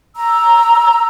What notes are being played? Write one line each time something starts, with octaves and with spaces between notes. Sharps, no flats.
A#5 E6